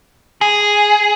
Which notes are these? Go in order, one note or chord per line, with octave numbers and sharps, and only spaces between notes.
G#4